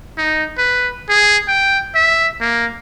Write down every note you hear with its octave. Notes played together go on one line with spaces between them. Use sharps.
D#4
B4
G#4
G5
E5
A#3